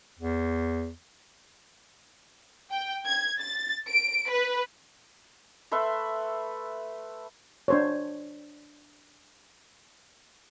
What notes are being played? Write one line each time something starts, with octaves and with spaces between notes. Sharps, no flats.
E2
G5
G#6
A6
D7
B4
A3 B4 E5 C6
D4 C5 C#5